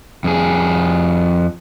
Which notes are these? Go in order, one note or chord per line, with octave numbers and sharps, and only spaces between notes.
F2 G#4